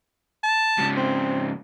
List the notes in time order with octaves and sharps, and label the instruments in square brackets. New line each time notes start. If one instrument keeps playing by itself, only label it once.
[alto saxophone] A5
[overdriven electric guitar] G#2 C#3
[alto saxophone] C4